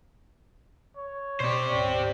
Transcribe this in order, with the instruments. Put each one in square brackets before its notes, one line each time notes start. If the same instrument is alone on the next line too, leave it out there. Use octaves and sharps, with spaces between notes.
[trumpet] C#5
[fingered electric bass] B2 [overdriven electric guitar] G4 C5 [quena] D5
[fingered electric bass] D1 G#2 C#4